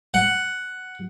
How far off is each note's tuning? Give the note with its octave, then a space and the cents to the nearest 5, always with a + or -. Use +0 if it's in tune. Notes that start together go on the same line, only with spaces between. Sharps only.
F#5 +5